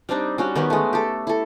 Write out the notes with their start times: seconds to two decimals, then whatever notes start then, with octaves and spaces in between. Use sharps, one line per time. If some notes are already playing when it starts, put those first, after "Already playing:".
0.09 G3 C4 D4 D#4
0.38 G3 C#4 F#4
0.55 D#3 B3 C#4 G4
0.70 G#3 A3
0.93 G4 A4
1.27 E4 A4